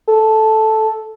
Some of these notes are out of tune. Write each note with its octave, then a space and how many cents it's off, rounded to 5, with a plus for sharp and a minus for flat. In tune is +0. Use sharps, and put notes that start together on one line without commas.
A4 -5